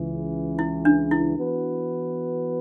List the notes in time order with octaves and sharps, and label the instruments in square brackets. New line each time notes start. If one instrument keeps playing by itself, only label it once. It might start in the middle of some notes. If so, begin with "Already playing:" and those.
Already playing: [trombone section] C#2 C#3 E3
[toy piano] E4
D4
E4
[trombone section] E3 B3 F#4 B4